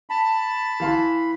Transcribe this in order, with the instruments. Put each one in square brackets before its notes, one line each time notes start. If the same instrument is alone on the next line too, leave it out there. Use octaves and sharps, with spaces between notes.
[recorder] A5 [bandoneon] B5
[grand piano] E3 F5 C6